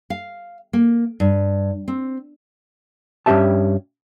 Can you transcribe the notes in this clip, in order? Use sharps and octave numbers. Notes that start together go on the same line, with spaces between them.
F5
A#3
G2
C4
G2 C#4 G4 G#4 E5 A5